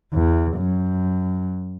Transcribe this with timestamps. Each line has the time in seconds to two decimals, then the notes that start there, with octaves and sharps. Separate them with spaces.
0.13 E2
0.57 F#2